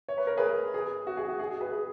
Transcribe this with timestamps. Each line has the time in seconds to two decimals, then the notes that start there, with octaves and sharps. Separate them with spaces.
0.08 C#5
0.18 B4
0.27 A#4
0.37 G#4 B4
0.74 G#4
1.07 F#4
1.17 G#4
1.28 F#4
1.40 G#4
1.50 G#4
1.61 G#4 B4
1.72 G#4